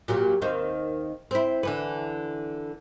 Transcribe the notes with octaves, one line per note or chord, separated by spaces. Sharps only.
A#2 F#3 G4
D#2 D#3 C4
C4 E4
D3 E3 B4